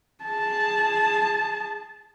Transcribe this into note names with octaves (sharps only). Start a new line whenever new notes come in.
G#4 A5